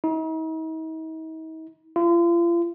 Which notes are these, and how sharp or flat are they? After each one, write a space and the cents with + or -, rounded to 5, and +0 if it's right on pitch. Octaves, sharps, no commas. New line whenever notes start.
D#4 +45
F4 -40